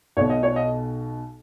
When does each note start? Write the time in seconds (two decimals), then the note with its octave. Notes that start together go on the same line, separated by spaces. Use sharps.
0.17 B1 B2 C#5
0.30 D#5
0.43 C#5
0.56 D#5